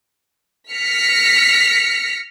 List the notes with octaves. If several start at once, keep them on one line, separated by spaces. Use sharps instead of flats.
F6 A#6 B6 C#7